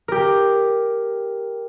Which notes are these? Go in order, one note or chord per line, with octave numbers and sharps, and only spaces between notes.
G4 A#4